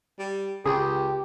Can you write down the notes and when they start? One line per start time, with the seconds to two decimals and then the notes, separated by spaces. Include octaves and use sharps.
0.19 G3
0.66 C#2 C#3 G4 G#4